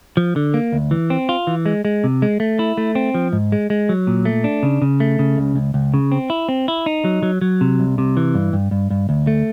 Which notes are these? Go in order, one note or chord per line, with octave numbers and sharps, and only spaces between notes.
F3
D3
A#3
D2
E3
C4
F4
E3
G#3
G#3
C3
G#3
A3
E4
A3
C4
F3
G#2
G#3
G#3
F#3
A#2
A3
D4
C#3
C#3
A3
C#3
C#2
C#2
C#2
C#3
C4
E4
C4
E4
D#4
F#3
F#3
F#3
C3
C2
C3
E3
G2
G2
G2
G2
D2
A3